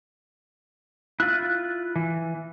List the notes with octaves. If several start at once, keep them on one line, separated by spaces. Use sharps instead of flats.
E4 F4 F#6
E3